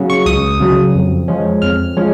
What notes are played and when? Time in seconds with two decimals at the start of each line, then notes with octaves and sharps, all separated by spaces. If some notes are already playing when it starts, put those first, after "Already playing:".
Already playing: C#3 F#3
0.10 C#6
0.26 C#2 D#6
0.60 C#3 F#3
0.95 F2
1.28 F3 G#3 C#4
1.62 F2 F6
1.97 F3 G#3 C#4